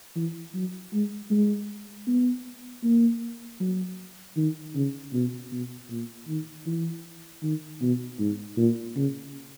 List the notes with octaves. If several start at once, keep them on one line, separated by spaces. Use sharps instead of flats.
E3
F#3
G#3
G#3
B3
A#3
F#3
D#3
C#3
B2
B2
A#2
D#3
E3
D#3
B2
G#2
A#2
C#3